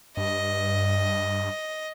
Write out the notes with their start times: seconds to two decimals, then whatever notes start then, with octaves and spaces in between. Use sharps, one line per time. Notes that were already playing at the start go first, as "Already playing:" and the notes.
0.17 G2 D#5